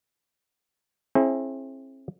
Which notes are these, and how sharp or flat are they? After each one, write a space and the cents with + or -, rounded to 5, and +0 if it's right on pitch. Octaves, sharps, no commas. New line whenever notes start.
C4 +40 E4 +0 G#4 +30